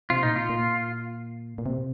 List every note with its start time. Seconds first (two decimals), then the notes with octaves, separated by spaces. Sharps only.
0.10 C3 F4
0.23 A#2 D#4
0.36 F4
0.49 A#2
1.58 A#2
1.66 C3